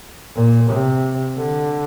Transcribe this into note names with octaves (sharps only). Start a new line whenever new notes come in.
A#2
C3
D3